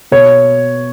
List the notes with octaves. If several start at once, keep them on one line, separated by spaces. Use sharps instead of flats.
B2 C#5